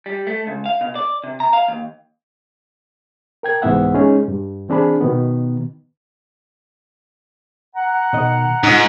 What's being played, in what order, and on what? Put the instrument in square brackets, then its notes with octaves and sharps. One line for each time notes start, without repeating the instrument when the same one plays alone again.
[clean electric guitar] G3
A3
C#2
F5
B2
D5
C3
A#5
F5
D#2
[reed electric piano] A#4 G5 G#6
C2 G#2 E3 B3 E5 F#5
G#3 C#4 D#4 G#4
G2
E3 C4 D4 G#4 B5
B2 D#3 B3
[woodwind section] F#5 A#5
[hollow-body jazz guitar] B2 D#3 D#5
[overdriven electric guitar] G#2 [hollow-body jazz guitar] D#4 F4